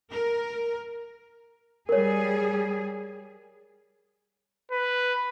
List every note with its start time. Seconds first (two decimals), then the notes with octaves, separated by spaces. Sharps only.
0.11 A#4
1.89 G3 G#4 A#4 C#5
4.71 B4